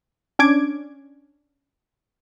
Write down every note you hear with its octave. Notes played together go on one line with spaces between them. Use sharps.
C#4 D4 D6 G#6 D7